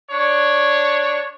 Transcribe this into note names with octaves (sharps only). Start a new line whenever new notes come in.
D4 C#5